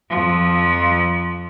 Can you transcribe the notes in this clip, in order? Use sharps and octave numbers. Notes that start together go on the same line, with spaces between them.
F2 F3